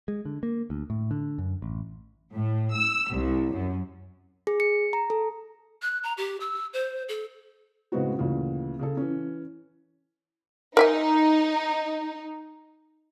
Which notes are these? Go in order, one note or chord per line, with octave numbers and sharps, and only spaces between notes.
G#3
D3
A#3
D2
A2
D3
F#2
A1
A2
E6
C2
F#2
G#4
C#7
A#5
A4
F#6
A#5
G4
E6
C5
A4
A2 C#3 G#3 B3 C4 F#4
D2 A#2 C#3 E3
C#3 G#4 A4
E3 C#4
D#4 A#4 E5 G#5